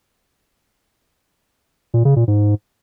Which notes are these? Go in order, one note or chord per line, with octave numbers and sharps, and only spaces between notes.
A#2
C#3
A#2
G#2